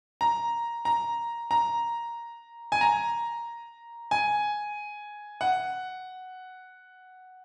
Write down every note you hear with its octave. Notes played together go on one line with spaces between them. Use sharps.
A#5
A#5
A#5
G#5
A#5
G#5
F#5